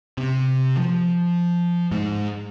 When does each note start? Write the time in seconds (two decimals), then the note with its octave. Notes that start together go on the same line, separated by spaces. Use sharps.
0.18 C3
0.77 F3
1.91 G#2